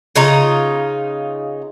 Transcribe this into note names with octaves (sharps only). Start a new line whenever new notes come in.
C#3 D#4 F4 A#5